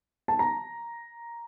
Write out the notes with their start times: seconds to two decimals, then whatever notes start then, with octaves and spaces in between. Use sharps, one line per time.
0.28 A5
0.39 A#5